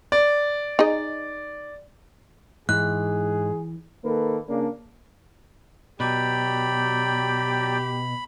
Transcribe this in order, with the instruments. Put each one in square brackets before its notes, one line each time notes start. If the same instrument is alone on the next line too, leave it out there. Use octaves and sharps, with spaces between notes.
[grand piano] D5
[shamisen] D#4 G#4 D#5
[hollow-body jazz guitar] G#2 [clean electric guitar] E3 [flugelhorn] G#4 [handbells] F#6
[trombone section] D#3 A#3 A4 B4
C#3 A#3 D4
[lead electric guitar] B2 [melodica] F#3 D5 G5 [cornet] G4 [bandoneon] B5